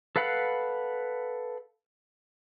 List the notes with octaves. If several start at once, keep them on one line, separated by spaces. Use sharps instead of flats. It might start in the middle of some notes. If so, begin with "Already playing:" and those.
A4 B4 F5 F#5 B5